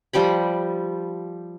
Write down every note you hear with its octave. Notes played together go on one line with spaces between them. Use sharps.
F3 G3 G5 B5